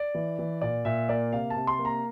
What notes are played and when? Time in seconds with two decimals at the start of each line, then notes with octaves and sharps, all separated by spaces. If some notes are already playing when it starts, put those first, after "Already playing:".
Already playing: D5
0.15 E3
0.39 E3
0.61 A#2 D5
0.85 A#2 E5
1.09 A#3 D5
1.33 C3 F5
1.50 A5
1.56 C3
1.67 C6
1.79 A#3
1.85 A#5